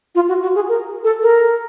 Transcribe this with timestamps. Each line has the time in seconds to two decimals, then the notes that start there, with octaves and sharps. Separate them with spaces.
0.15 F4
0.28 F#4
0.42 F#4
0.55 G#4
0.69 A#4
1.04 A4
1.22 A#4